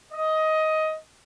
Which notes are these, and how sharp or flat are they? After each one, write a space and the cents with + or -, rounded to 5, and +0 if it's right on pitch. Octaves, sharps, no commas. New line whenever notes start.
D#5 +15